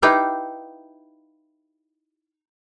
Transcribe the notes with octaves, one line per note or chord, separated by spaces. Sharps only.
D#4 E4 G4 B4 F5